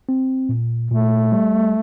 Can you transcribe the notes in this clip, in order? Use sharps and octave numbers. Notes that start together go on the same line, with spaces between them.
C4
A#2
A#2 A3
G3